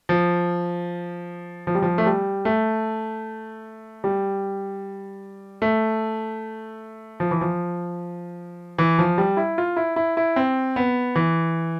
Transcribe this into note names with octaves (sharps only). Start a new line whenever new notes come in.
F3
F3
G3
F3
A3
G3
A3
G3
A3
F3
E3
F3
E3
F3
G3
E4
F4
E4
E4
E4
C4
B3
E3